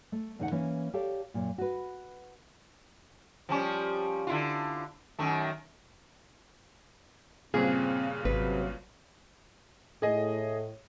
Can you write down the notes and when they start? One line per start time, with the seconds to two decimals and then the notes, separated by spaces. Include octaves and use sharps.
0.12 A3
0.39 E2 C#3 D#4 D5 F#5
0.51 E3 A#3 C#4
0.93 G4 A4 C#5 D5 F5 A5
1.34 F#2 A#2
1.58 F#4 B4
3.49 F3 G3 C#4
4.27 D3 E4 F4
5.19 F#2 D#3 A3
7.54 G2 A#2 C#3 C4 G#4
8.25 G#1 C3 F#3 B4
10.02 A2 G#4 D#5